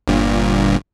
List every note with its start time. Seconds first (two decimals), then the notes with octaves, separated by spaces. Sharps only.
0.08 G1 G2 A#2